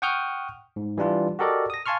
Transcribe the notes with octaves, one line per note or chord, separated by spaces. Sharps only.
F#5 G5 C#6 D#6 F6 G6
G#2
E3 G3 D4 F4
F#4 G4 A4 A#4 D5 D#5
D#6 A#6
F5 G#5 A5 C6 C#6 F6